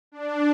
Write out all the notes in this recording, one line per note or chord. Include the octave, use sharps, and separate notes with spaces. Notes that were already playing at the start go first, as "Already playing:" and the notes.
D4